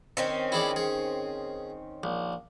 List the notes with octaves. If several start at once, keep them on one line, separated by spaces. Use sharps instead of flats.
D#3 C4 C#4
E4 G#4 D5
G#4
A#1